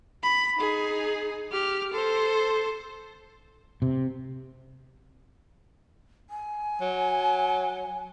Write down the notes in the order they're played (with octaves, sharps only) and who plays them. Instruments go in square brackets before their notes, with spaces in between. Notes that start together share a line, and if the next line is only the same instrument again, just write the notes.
[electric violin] B5
D#4 G#4
G4 F6
A4 C5
[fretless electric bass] C3
[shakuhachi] G#5
[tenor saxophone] F#3